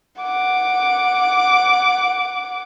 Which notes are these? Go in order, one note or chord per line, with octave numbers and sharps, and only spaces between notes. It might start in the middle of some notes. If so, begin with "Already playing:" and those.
F#5 D6